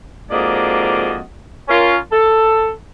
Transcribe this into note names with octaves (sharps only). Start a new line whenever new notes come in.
F2 G#2 A#3 F#4 D5 D#5
C#4 F4 A#4
A4